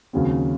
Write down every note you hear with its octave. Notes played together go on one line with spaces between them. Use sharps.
D#2 C#3 F#3 C4